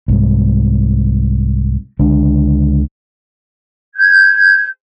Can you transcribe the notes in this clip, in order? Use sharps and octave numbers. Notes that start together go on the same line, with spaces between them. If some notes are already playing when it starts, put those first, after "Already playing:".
C2 G#2
C#2 D3 G#3 D4
G6 G#6